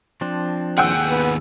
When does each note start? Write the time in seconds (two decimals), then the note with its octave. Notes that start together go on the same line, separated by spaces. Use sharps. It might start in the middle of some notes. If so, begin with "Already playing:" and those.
0.21 F3 C4 D4
0.78 D#2 G#4 F#5 G5 E6
1.08 B3